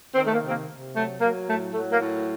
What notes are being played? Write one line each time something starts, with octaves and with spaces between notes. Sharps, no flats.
D#3 C4
A3
A#3
C3 C4
A#3
C3
F#3 A3
F#3 A#3
A2 A3
F#3 A3
A#3
A2